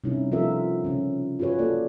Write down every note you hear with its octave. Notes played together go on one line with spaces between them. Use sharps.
C3 G3 C#4 D#4 E4
F3 B3 F4 A4 A#4 E5
C#3 C#4
F4 F#4 G#4 B4 C#5
A#3 F4 A4 D5